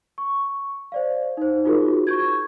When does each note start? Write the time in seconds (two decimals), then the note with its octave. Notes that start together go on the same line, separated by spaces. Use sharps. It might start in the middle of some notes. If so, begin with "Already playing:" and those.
0.18 C#6
0.92 C5 D5 F5
1.37 D#4 C5
1.65 D#4 F4 F#4 G#4 A#4
2.07 C#6 G6 G#6